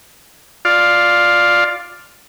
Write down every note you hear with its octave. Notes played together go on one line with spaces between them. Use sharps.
F4 D5 F5